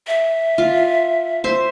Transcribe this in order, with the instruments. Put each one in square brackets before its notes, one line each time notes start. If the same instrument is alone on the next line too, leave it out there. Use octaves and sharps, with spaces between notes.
[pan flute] E5
[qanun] F4
C5 E5